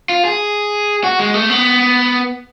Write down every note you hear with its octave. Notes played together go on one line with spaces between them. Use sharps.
F4
G#4
F#4
G#3
A3
B3